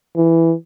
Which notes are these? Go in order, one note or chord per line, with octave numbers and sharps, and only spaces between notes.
E3